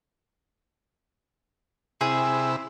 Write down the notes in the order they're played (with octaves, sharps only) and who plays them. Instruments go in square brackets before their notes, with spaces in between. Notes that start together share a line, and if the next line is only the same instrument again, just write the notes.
[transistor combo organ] C3 E4 [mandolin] G#4